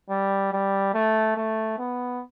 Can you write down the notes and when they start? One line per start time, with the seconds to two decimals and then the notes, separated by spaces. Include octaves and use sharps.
0.10 G3
0.52 G3
0.94 A3
1.37 A3
1.79 B3